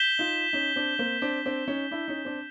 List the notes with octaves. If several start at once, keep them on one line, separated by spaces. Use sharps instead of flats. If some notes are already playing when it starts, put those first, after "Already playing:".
Already playing: G6 B6 E7 G7
D#4 F4
C#4 D#4
C4 D4
A#3 C4
C4 D4
C4 D4
C#4 D#4
D4 E4
C#4 D#4
C4 D4